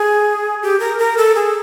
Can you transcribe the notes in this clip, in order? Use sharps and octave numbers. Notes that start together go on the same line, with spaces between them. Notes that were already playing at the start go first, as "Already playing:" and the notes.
Already playing: G#4
G4
A#4
A#4
A4
G#4